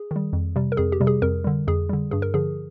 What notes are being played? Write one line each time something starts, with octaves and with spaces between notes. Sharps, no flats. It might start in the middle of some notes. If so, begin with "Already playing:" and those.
Already playing: G#4
D#3 G3
F2
C3 G3
A#4
F2 G#4
G4
C3 G3
G#4
F2 A#4
D3 G3
F2 G#4
D3 G3
G2 G#4
A#4
D3 F3 G#4